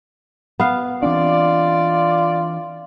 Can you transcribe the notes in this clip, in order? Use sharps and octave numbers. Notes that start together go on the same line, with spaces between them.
B3 F5
E3 C4 D4 F4 D5